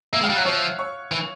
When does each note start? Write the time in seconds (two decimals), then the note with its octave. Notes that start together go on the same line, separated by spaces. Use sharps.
0.13 A#3 E5 E6
0.21 G#3 F5 F6
0.30 G3
0.35 F#3 F#5 F#6
0.45 F3 C#5 C#6
0.79 C#5 C#6
1.11 E3